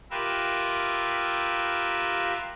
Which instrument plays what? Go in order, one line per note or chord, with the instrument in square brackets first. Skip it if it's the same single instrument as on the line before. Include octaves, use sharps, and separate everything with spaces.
[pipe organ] F4 G4 A#4 B4 E5